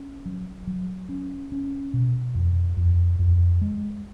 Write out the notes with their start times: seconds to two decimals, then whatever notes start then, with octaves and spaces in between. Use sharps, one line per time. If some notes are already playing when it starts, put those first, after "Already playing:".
Already playing: C#4
0.26 F#3
0.67 F#3
1.09 C#4
1.52 C#4
1.94 B2
2.35 F2
2.77 F2
3.19 F2
3.61 G#3